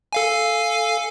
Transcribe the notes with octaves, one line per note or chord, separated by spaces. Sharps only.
A4 F5 G#5